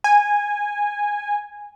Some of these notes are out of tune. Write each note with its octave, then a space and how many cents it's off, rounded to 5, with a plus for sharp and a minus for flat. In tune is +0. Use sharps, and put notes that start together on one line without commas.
G#5 -10